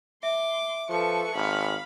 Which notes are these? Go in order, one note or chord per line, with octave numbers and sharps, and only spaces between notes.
E5 C6 D6
F3 A4 B4 C#6
G#1 F5 B5